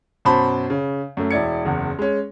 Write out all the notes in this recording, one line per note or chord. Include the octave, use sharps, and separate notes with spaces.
F#2 B2 C5 A5 B5
C#3
F#2 A3
E1 E4 D5 G#6 C#7
F#1 E2
G#3 C#4